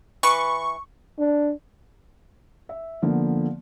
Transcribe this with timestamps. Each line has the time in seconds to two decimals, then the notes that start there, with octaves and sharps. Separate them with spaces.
0.23 E3 B4 C#6
1.18 D4
2.69 E5
3.02 D3 F3 A#3 B3